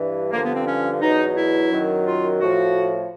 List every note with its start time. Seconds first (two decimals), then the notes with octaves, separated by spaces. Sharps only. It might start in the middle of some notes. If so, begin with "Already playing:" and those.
Already playing: G2 E3
0.32 G2 D3 F3 A#3
0.43 B3
0.55 C4
0.67 C#4
1.01 E2 B2 F#3 D#4
1.36 E4
1.71 F#2 D#3 F#3
2.05 F4
2.40 A2 F3 F#4